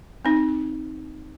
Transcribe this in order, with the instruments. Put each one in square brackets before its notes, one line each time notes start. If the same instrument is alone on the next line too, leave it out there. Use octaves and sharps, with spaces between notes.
[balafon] C4 D#4